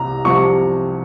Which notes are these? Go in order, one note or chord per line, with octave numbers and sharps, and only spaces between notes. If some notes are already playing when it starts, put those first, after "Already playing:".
Already playing: C2 C3 A#5
C2 C3 F3 C#6